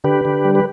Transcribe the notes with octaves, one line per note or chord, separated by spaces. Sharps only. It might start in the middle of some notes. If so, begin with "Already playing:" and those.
D3 G4 B4
D3
G3
B4